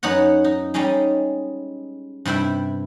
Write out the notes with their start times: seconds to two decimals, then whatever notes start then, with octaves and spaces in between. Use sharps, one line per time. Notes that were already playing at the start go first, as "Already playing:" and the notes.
0.03 F#2 B3 D#4 C#5 F#5
0.44 D#4
0.74 G3 G#3 C#4 D#4 G#4
2.25 G2 C3 E4 E5 G5